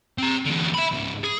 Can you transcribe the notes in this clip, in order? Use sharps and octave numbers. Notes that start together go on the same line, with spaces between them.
C4 A#5
E2 D3
E5 B5
C#2 G#2
G#4